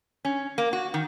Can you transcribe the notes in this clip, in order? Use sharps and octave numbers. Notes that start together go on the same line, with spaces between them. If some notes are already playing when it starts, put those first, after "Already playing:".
C#4
A#3
F#4
D#3